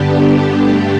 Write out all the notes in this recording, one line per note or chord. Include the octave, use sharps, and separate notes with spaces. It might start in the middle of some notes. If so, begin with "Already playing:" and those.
Already playing: G2 D3 B3 D4 G4
G4
G2 D3 A3 D4